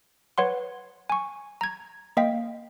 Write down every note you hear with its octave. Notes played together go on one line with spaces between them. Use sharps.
B4 C#5 F#5 C6
G#5 C#6
A#5 G#6
A#3 D#5 F5 G5 B6